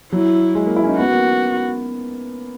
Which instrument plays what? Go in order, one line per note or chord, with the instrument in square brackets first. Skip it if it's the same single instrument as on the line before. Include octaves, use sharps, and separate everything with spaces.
[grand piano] F#3 [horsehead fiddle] E4
[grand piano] G#3
A#3
E4
C#4
D#4
[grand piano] B3 [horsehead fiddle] F#4
[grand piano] A#3